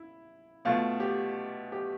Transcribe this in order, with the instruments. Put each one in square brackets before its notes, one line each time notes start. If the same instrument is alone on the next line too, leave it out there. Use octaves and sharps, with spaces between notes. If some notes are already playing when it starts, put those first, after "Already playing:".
Already playing: [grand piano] E4
B2 A3 F4
G4
G4